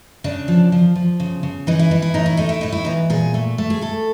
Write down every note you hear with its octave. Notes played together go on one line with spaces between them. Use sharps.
C#3 D4
F3
F3
F3
C#3
C#3
E3 D#4
E4
E3 D#4
E4
A2 D#4
E4
A3 D#4
E4
A2 D#4
E4
E3 D#4
A#2 G#4
A3
A3
G#4
A3 A4